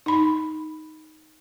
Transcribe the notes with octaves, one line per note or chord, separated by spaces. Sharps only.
D#4 B5